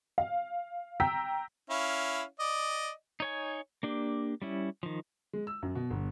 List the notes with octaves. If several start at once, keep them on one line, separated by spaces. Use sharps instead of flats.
F5
G5 A#5 E6 B6
C#4 E4 F5
D5 D#5
D#4 C#5 G#5
A#3 D4 G4
G3 C#4 E4
D#3 F3
G#3
E6
F#2
B2
G1